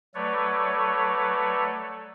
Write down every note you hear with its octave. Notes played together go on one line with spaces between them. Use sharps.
F#3 A3 A4 B4 C#5 D5